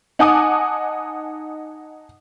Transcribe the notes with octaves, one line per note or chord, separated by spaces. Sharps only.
D#4 F#5 G#5 A5 D6 D#6